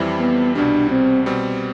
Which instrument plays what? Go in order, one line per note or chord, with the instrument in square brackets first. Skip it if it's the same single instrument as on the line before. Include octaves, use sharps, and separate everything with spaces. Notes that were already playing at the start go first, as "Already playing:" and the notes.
Already playing: [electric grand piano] F2 E3 G3 C4 E4
[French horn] B3
[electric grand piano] C2 B2 G3 [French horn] D4
[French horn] C4
[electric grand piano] B2 G3 C4